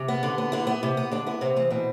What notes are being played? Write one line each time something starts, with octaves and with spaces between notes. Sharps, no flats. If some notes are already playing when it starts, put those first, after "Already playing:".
Already playing: C3
B3
D3
B3
D3 E4
B3
C3
B3
D3 D4
B3 E4
C3 C4
E2 C4
B2 C4